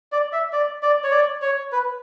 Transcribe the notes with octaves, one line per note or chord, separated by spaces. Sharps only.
D5
E5
D5
D5
C#5
D5
C#5
B4